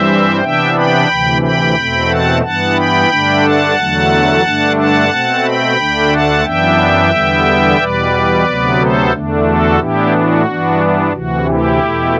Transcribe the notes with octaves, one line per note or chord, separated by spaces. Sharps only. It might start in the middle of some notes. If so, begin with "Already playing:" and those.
Already playing: G2 E3 G3 C4 C5 E5
C3 E3 B3 D4 E5 G5
G5 B5
D2 C3 E3
G5 B5
E2 B2 A3 C4
F#5 A5
G2 E3 B3 F#5 A5
G5 B5
G2 D3 A3 D4
F#5 A5
E2 D3 F#3 A3
G2 D3 A3 D4
F#5 A5
B2 A3 C4
G5 B5
D2 D3 A3 D4
F#5 A5
F#2 E3 B3 D4 E5 G5
E2 D3 G3 B3
E2 B2 G3 B4 D5
D2 C3 F#3 B3
A4 C5
E2 D3 A3 D4
F#4 A4
A2 E3 B3 D4 E4 G4
F#4
G2 E3 B3 D4
D2 C3 E3 F#4
E4 G4
E2 B2 A3